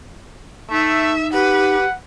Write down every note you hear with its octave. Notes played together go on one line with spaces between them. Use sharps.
A3 D#4 E5
G4 B4 F#5